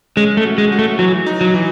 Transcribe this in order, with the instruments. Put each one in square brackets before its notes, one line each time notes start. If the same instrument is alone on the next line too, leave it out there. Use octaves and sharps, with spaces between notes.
[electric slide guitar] G#3 [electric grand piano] C#4
[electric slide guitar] A3
[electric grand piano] F#4
[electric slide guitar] G#3
[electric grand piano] F#4
[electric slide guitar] A3
[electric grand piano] E3 [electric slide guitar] F#3
[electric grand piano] D#4
[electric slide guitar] F#3
[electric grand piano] E3